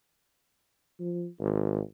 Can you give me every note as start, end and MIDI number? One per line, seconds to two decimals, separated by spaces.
1.00 1.26 53
1.40 1.80 32